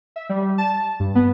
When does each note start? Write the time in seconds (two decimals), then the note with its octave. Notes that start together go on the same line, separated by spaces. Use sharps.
0.16 E5
0.29 G3
0.42 G3
0.58 A5
1.00 G2
1.15 B3